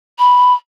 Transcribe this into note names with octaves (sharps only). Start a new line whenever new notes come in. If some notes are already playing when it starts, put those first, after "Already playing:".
B5